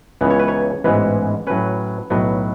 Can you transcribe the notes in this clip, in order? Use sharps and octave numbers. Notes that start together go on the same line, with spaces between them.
C#2 C#3 E3 B3
C#5
B4
C#5
A1 G#2 E3 G#3 B3
A2 F#3 C#4 B4
B1 A2 F#3 B3